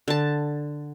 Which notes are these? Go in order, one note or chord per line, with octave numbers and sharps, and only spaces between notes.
D3 A5